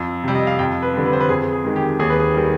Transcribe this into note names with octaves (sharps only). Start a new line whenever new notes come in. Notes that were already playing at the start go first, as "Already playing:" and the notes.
Already playing: F2
C3 G3
D#5
F5
F2 G5
B4
D3 G3
B4
C5
B4
F2 G#4
G#4
D#3 G#3
G4
D#2 G#4
B4
G#4
D#3 G3